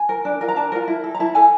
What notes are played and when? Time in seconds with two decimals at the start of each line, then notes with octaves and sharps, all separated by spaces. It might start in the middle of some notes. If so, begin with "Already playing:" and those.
Already playing: G#5
0.09 A#4
0.25 D4
0.41 F4 A#4
0.48 A#5
0.56 D4 A5
0.72 F4 A#4
0.88 E4
1.04 A4
1.14 A#5
1.20 E4 A5
1.35 A4 G#5